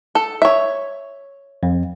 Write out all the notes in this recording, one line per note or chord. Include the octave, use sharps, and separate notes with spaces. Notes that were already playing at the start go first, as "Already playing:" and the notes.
A4
C#5 E5
F2